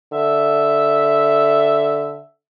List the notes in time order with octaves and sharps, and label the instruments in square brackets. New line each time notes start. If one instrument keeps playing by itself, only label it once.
[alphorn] D3 [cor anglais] E5